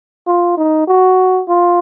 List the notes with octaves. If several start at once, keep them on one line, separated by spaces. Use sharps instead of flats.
F4
D#4
F#4
F4